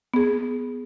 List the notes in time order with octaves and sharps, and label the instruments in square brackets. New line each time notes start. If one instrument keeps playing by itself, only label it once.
[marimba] B3 G#4